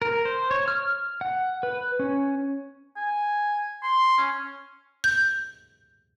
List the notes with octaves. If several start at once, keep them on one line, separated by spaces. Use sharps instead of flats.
A#4
C5
C#5
F6
F#5
B4
C#4
G#5
C6
C#4
G6